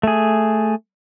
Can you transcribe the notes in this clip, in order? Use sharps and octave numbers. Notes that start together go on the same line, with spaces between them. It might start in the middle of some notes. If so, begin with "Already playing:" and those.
A3 G#4